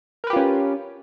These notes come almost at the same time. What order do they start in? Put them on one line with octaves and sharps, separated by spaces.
A#4 B4 G4 F4 C#4